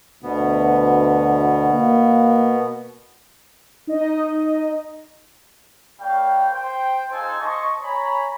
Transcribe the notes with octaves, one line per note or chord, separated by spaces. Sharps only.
D2 B2 B3
A#3
D#4 D#5
G3 A#3 C#5 F5 G5
C5 G5
G#3 D#4 F4 A4 C5 G#5
C5 D#5 A5 C#6
C#5 G#5 A#5 B5